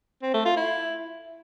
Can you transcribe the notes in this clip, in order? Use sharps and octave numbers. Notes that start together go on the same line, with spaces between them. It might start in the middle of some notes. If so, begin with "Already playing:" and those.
C4
A3
F4
E4